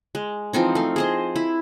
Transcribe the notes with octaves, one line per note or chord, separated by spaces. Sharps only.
G#3
E3 F3 C4 D#4
A3 F5
G#4 C5 D#5
E4